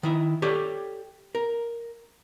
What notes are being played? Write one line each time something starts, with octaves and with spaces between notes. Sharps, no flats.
D#3 E4 E5
G4 A4 C#5 D5
A#4